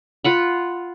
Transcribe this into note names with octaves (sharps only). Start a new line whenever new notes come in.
F4 F#5 B5